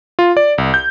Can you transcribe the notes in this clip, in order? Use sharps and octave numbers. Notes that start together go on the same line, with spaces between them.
F4
D5
C2
G6